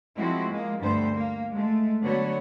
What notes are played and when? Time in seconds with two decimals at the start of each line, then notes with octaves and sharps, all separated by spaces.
0.17 F3 G#3 C4 E4 F#4
0.51 G#3 A#3
0.80 D2 G2 B3 C5
1.12 A#3
1.53 G#3 A3
2.02 D3 F#3 B3 F#4 C#5